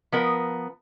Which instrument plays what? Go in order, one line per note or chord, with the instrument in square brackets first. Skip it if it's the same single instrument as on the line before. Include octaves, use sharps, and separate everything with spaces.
[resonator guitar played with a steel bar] F3 B3 A#4